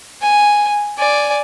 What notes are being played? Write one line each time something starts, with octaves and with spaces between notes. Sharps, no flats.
G#5
D5 G#5